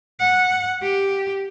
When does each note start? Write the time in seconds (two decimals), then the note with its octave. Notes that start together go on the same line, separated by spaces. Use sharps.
0.19 F#5
0.82 G4